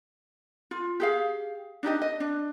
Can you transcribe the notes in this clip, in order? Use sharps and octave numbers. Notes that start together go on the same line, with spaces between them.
F4
G4 G#4 F5
D4 D#4 G4 D#5
D#5
D4